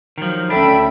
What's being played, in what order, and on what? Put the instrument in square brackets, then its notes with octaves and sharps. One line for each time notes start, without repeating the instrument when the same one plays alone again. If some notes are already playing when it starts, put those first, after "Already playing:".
[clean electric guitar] D#3 F3 [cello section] F#3
[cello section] D2 C#4 E5 [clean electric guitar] D4 [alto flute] A4 [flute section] G5 B5